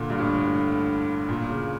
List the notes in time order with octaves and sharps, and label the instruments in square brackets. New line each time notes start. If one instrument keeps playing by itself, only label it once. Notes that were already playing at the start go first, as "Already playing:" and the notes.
Already playing: [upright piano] A#2 D3
G2
A2
A#2
C#3